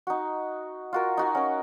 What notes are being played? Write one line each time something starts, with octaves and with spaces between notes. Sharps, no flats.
D#4 F#4
F4 F#4 A#4
D#4 F#4 G#5
C#4 A#4